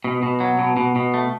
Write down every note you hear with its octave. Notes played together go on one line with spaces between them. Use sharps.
B2
B2
F#3
B2
B2
B2
A3